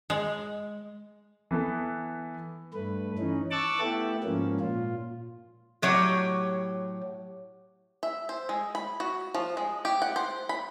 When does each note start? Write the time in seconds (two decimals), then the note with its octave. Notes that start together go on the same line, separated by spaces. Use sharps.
0.10 G#3
1.51 E3 B3 A4
2.74 G2 A3 B4
3.18 E3 C#4 D#4
3.51 A5 C#6 D6 E6 F#6 A6
3.80 A3 B3 E4 G4
4.24 G#2 F3 A#3 C#4
4.60 A#2 F4
5.82 A2 F#3 G4 C#5
8.03 E5
8.29 C5
8.49 G#3
8.75 B5
9.00 F#4
9.35 F3
9.57 G#3
9.85 G4
10.02 F#5
10.16 C5
10.49 B5